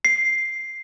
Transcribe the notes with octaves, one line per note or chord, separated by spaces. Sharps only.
C7